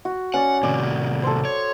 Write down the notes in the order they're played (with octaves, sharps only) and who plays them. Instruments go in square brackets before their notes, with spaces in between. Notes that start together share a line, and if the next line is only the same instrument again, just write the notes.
[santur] F#4
[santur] C#4 D5 [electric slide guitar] F#5
[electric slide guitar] A2 C3 D#3 [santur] D5
[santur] A4 C5
[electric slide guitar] C#5